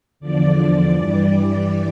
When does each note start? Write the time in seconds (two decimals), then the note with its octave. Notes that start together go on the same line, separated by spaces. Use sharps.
0.20 E2 D3 F3 D5
0.94 G2 E3 G3